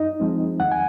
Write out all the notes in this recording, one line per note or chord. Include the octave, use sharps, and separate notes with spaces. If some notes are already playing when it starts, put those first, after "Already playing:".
Already playing: F#2 D#4 D#5
F3 G#3 C4
D#2 F#5
G#5